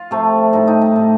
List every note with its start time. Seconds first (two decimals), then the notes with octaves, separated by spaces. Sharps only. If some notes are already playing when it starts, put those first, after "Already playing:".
Already playing: F4
0.11 C3 F3 A3
0.53 A2 G3 D#4
0.68 D#4
0.82 D#4
0.96 A2 G3